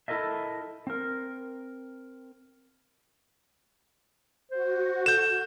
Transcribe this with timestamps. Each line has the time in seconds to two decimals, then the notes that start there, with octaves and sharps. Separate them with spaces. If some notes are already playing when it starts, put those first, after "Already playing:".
0.08 E4 A4 A#4 D#5 E5
0.87 C4 A#4
4.51 F#4 C5
5.06 A4 G6 E7